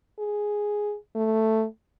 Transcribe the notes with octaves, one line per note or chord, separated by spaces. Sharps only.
G#4
A3